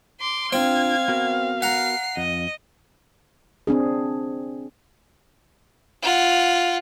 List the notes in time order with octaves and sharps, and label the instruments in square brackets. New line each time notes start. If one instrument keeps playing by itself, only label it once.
[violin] C6 D6
[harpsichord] C4 [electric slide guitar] D4 F4 G5 [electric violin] F5 [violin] G#6
[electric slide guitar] B3 F#4 A#4
[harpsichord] F#5 A#5 [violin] C7
[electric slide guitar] F2 [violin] D#5
[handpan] C4 D4 G#4
[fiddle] F4 F#5